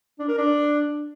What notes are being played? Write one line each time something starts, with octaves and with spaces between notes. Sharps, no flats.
D4
A#4
D4